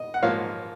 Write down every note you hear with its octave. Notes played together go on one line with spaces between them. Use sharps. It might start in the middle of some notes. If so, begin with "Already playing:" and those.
Already playing: D#5
F#5
G#2 F3 A#3 C#5 F5